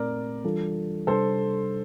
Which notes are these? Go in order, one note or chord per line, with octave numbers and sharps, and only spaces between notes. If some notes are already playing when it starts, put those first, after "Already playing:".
Already playing: A#2 A3 C4 A#4 D5
E3 G3 D4 F4 A4
C3 G3 D4 A4 C5